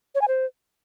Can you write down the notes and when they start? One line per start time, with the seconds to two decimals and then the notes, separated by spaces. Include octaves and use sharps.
0.15 C#5
0.21 G#5
0.28 C5